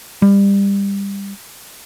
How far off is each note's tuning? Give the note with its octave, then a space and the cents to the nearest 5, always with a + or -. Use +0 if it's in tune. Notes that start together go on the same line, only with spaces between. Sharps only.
G3 +25